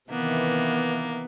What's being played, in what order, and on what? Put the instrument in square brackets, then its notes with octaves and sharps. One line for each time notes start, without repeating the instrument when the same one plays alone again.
[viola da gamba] C3 D#3 E3 [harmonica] A#3 [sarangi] B3